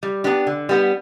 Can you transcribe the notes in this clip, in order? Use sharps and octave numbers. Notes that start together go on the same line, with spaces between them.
G3
B3 D4 G4
D3
G3 B3